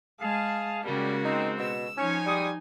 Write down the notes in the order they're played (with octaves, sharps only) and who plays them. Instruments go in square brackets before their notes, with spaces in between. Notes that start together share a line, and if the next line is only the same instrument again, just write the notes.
[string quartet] G#3 [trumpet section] G#4 F5 [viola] A5
[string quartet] C#3 A#3 [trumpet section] G3 [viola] G#3 F#4
[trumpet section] C4 [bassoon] D#4
[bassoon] B2 [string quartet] E6
[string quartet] F3 [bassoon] C#4 [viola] D#4 G#5 [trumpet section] C#5
[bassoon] G3 [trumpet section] G#3 C#6 D#6